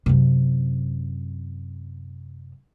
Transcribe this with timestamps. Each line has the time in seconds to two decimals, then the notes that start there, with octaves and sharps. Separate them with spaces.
0.06 F#2 C3